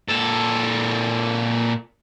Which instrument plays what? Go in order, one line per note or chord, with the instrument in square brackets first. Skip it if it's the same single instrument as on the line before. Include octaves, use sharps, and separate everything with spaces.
[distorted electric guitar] A#2 A4